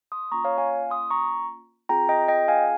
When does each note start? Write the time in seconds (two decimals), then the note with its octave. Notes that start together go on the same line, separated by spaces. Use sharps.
0.12 C6 D#6
0.32 A#3 C#4 F4 A#5 C#6
0.45 C#5 F5
0.58 F5 G#5
0.91 C6 D#6
1.10 A#5 C#6
1.89 C4 F4 G#4 G5 A#5
2.09 D#5 G5
2.28 D#5 G5
2.48 F5 G#5